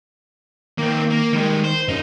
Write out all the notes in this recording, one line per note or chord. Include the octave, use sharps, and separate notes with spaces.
D#3 A#3 C4
A#3
D#3 G3 G#3
C5
F#2 D#4 F4